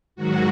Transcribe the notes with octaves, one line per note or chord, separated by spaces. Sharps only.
G#2 D#3 F#3 F#4